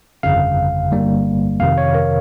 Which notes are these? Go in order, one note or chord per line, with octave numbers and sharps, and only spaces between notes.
G1 F2 C#3 F5
G1 G2 G3 A#3
F2 C3 D#3 F5
C#5
A#4